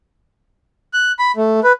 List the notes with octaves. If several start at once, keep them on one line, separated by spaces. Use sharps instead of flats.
F#6
B5
A3
B4